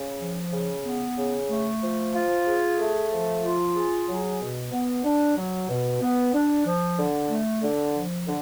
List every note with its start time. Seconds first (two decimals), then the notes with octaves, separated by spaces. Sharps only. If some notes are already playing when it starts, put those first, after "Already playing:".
Already playing: C#3
0.19 F3
0.52 C#3
0.85 B3
1.17 C#3
1.49 A3
1.81 F3
2.13 F4
2.46 G#4
2.79 A3
3.11 F3
3.43 F4
3.75 G#4
4.07 F#3
4.40 B2
4.72 B3
5.04 D4
5.37 F#3
5.69 B2
6.01 B3
6.33 D4
6.65 F3
6.97 D3
7.30 A3
7.62 D3
7.95 F3
8.27 D3